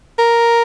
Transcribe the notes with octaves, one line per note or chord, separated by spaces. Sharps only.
A#4